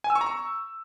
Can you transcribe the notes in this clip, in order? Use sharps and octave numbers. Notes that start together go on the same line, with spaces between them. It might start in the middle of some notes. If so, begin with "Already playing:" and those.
G#5
E6
C#6
A#5
C#6